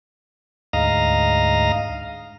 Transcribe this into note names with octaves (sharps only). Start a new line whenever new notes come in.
D2 G#2 D#5 F5 A#5